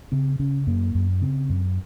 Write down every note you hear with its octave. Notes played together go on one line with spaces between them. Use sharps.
C#3 C4
C#3 C#4
F#2 A#3
F#2
C#3 C4
F#2